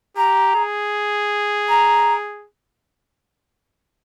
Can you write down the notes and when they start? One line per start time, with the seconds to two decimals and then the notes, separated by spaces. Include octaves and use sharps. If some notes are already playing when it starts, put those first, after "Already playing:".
0.16 G4 A#5
0.55 G#4
1.68 A#5